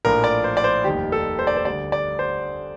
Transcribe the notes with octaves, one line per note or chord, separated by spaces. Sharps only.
A#1 A2 F3 A#4
D5
C5
D5
C5
F1 D#2 D#3 G3 G4
A4
C5
D5
C5
D2 D3 G3 D5
D5
C5